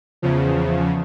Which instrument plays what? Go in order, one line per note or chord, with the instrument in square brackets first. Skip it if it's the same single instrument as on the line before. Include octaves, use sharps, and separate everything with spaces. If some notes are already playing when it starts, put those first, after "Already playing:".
[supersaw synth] E2 C#3 F3